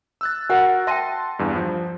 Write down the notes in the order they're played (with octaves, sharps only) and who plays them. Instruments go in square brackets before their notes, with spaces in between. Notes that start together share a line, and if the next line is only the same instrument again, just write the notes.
[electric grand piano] E6 F#6 A6
[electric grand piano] F#4 A#4 [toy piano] E5 F#5
[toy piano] E5 G5 [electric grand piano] A5 C6 D#7
[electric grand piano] E2 G2
F3